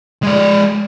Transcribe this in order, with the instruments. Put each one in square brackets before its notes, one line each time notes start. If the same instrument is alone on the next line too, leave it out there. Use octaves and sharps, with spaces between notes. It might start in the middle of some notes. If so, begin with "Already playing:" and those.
[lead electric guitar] G#3 D5